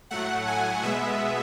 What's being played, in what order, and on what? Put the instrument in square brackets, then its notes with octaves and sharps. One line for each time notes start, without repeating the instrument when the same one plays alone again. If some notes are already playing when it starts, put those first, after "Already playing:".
[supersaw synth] A2 F#3 A3 F#5
G#5
B2 G#3 B3 E5